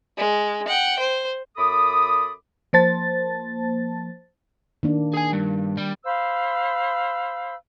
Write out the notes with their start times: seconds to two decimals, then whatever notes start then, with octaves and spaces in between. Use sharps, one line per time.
0.17 G#3
0.68 F#5 G5
0.99 C5
1.57 F#2 A4 B5 D6 D#6
2.73 F3 A#3 C5 A5 A6
4.83 D#3 A#3 D4
5.14 G#4 G#5
5.33 G2
5.77 G3
6.05 C5 F5 B5 E6